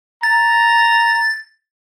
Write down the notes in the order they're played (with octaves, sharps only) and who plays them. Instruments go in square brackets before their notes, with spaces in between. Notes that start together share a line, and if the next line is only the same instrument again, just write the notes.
[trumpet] A#5 [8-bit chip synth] A6